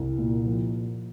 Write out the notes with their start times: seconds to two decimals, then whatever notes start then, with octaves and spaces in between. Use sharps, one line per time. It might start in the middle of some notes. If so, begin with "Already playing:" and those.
Already playing: C2
0.18 A#2
0.46 F3